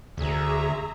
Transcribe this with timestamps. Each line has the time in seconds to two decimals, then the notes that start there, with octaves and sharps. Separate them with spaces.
0.17 D2 G#4 E5 A#5